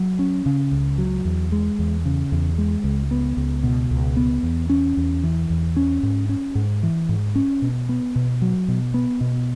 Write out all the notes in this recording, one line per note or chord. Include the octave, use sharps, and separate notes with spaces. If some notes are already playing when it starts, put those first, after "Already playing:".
Already playing: F#3
C#4
C#3
C#2
F#3
E2
G#3
E2
C#3
E2
G#3
C#2
B3
C#2
B2
C#2
B3
E2
C#4
E2
E3
E2
C#4
G#2
C#4
G#2
E3
G#2
C#4
B2
B3
B2
F#3
B2
B3
B2